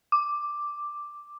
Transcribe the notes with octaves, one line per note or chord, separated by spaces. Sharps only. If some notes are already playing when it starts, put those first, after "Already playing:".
D6